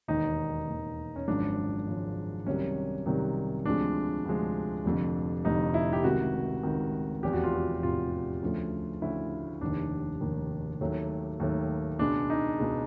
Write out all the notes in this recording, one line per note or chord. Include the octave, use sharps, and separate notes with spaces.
E1 D#2 D#3 D#4
E1 D#2 D#3
C#4
G#1 F#2 C#3 F3 G#3 D4
G#1 F#2 C#3 F3 G#3
C2 C3 D#3 F#3 C#4
C2 C3 D#3 F#3
D2 C3 F3 G#3 D4
D2 C3 F3 G#3
F1 F2 D3
F1 F2 D3 D#4
E4
G4
C#2 C3 D#3 F#4
C#2 C3 D#3
F1 E2 C3 G4
F#4
F4
F#4
F1 E2 C3 F4
D2 C#3 F3 A3
D2 C#3 F3 A3 E4
F1 D#2 D#3 D4
F1 D#2 D#3
D#2 D#3 F#3 A3
D#2 D#3 F#3 A3
C#2 B2 G#3 D4
D#4
C#2 B2 G#3